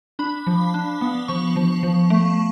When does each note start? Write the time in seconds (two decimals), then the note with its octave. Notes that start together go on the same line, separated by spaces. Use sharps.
0.19 D4 B5
0.47 F3
0.74 D4
1.01 B3
1.28 F3 C#6
1.56 F3
1.83 F3
2.10 A3